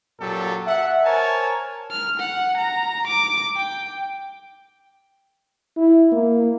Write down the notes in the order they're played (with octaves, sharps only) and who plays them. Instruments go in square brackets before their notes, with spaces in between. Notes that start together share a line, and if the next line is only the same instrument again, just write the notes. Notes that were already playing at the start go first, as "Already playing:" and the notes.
[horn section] F#2 A#2 F#3 G4 A4
E5 F#5
A#4 C5 C#5 G#5 A5
[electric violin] F6
F#5
A#5
D6
G5
[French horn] E4
A#3